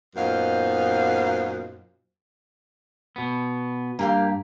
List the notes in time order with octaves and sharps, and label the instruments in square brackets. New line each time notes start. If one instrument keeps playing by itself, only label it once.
[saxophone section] F#2 A#2 B3 D#4 C5 F5
[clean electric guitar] B2 B3
[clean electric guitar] G2 [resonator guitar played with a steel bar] A#3 G4 F5